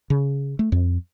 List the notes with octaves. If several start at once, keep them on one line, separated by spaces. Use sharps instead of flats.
C#3
A3
F2